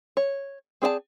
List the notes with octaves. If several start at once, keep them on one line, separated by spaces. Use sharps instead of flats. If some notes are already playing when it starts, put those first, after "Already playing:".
C#5
C4 G#4 D5 E5 A5